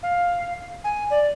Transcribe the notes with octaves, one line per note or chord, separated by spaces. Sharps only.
F5
G#5
D5